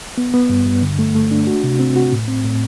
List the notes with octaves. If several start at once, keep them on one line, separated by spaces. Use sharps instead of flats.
B3
B3
G2
G2
D3
A3
A3
D4
F#4
C3
C4
F#4
A2
C4
A2